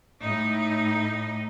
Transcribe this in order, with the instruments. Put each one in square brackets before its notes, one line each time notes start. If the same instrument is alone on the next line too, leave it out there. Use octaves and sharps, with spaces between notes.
[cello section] A2 D#4